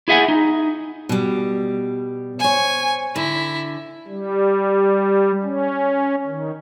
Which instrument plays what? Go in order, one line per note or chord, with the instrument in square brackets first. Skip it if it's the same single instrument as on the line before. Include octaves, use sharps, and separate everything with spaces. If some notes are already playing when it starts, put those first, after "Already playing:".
[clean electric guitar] E4 G#4 E5 F#5 G#5
D#4
[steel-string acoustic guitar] B2 G3
[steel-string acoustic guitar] C5 C#5 [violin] G#5
[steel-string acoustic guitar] D3 [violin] E4
[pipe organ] G3
C#4
D#3